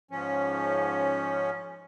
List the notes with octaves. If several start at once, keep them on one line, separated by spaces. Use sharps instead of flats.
G#2 F3 C#4